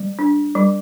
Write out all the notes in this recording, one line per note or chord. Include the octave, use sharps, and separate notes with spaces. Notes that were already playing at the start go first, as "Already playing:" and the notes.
Already playing: G3
D4
G3